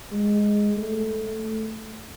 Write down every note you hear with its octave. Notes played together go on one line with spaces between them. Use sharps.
G#3
A3